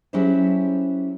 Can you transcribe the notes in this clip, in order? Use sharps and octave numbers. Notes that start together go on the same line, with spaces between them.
F#3 C#4 E4 G4 G#4 C5